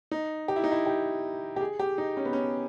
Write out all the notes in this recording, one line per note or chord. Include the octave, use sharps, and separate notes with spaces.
D#4
G4
E4
D#4
E4
G4
G4
G#4
G4
D#4
C#4
B3
C#4